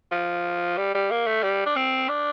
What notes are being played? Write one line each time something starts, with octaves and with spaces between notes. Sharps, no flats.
F3
G3
G3
A#3
A3
G3
D4
C4
D4